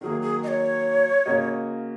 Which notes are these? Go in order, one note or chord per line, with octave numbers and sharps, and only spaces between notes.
D#3 F#3 A#3 G#4
G#4
D#5
C#5
C#3 A#3 F#4 D#5